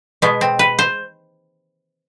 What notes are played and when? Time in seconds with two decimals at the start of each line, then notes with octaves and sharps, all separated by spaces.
0.22 B2 G#3 B3
0.41 C4
0.59 B4
0.79 C5